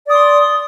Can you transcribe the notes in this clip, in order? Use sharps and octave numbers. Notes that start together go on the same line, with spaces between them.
D5 C6 D#6